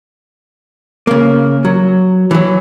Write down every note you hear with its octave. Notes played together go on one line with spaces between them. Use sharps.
C#3 A#3
F#3
E3 F#3